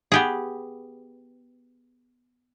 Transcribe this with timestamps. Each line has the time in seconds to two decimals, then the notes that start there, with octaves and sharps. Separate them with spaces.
0.12 B3 G4 G#4